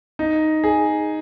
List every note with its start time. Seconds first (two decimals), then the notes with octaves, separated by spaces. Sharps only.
0.19 D#4
0.64 G#4